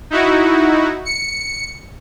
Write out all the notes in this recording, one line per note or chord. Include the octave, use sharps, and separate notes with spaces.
D#4 E4 F#4
C#7